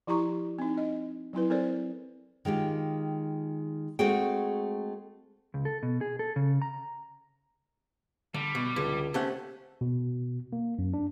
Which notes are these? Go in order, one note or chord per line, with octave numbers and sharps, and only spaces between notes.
F3 E4 G4 A#5 C#6
C4 D#4
D#5
F#3 C4 E4 B4
C4 A4 A#4 C5 D5
D#3 G#3 F4 G4
G#3 A3 C4 F#4 G#4 G5
C#2
A4
B2
G#4
A4
C#3
A#5
D3 G3
B2
C#2 D3
C3 A3 C#4 F#5
B2
A#3
F#2
D4